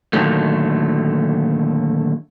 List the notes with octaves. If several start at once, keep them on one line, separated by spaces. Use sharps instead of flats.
A#2 D3 D#3 F#3 A3